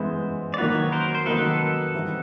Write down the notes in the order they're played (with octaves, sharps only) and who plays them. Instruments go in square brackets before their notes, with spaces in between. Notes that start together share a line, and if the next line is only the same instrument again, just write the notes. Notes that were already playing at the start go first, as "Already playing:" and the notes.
Already playing: [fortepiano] E3 G#3 B3 [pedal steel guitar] C5
[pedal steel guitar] D5
[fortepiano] D#3 F#3 A#3 D#4 F#4 [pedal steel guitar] B4 C#5
[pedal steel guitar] A#4 C5
C5
[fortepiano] D#3 F#3 A#3 D#4 F#4 [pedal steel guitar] A4 B4
[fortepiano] E3 G3 C4 D#4 F#4